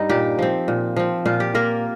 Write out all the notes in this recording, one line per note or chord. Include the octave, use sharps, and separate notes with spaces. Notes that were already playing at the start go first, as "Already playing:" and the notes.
Already playing: G2 G3 D#4
A#2 G4
F3 C4
A#2
F3 C4
A#2 F4
G4
A#3 F4 A#4